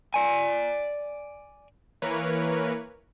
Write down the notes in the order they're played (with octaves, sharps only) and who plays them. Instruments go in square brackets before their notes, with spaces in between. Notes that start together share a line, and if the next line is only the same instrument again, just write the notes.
[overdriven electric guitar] D5 G#5
[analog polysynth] E3 A#3 A#4 B4 C#5